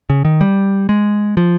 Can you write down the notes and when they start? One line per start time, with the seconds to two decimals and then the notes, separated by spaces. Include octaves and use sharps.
0.10 C#3
0.25 D#3
0.41 G3
0.89 G#3
1.37 F3